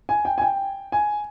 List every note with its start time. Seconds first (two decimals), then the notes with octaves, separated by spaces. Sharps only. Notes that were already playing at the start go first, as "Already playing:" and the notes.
0.09 G#5
0.25 G5
0.38 G#5
0.42 G5
0.92 G#5